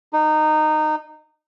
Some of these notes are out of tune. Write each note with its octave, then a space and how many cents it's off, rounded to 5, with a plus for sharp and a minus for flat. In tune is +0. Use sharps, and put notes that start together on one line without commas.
D#4 -20